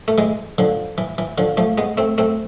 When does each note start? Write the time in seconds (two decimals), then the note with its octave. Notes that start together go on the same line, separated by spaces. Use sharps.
0.08 A3
0.18 E3 G#3
0.58 D3 F3
0.98 E3
1.18 E3
1.38 D3 F3
1.57 F3 A3
1.78 G#3 B3
1.97 A3 C4
2.18 A3 C4